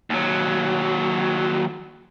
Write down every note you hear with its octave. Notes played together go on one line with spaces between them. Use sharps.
D#2 F#3